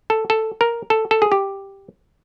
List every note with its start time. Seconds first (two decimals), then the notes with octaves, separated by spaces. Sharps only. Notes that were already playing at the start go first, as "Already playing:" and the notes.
0.10 A4
0.30 A4
0.61 A#4
0.90 A4
1.11 A4
1.22 G#4
1.32 G4